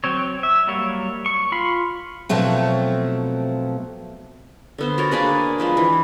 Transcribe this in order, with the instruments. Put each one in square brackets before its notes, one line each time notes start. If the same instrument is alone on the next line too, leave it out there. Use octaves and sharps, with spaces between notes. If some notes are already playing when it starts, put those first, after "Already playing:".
[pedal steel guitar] F#3 C4 C#5
E5
F#3 G3 A#3 C#5
C#6
F4 B5 C6
[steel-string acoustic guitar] B2 F3 F#3 A3 C4
[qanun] D3 B3 C5
F#4 A#4 C#5 D5
A#3 D4 G#4 B4
F3 G#3 B4 C5
E3